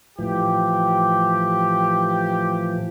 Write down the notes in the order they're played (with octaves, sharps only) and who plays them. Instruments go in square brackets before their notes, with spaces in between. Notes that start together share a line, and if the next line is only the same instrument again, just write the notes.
[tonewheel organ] A2 E3 F3 [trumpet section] G4